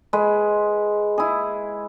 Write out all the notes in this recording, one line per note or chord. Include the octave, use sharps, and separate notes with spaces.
G#3 B4
E4 G#4